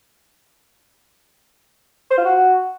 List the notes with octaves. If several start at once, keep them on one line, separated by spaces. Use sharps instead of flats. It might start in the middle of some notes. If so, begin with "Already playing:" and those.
C5
F4
F#4